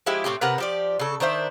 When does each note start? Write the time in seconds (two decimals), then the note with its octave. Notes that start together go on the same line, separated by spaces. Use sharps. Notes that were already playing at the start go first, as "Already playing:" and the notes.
0.06 F3 G#3 E4 G4
0.24 A2 A3 C4 G4
0.41 C3 A#4 B4 F#5
0.58 F3 G4 D5
0.99 C#3 A4
1.20 D#3 D4 C5 E5